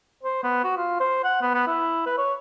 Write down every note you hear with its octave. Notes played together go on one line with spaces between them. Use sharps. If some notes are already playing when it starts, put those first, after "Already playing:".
C5
B3
F#4
F4
C5
F#5
B3
B3
E4
B4
C#5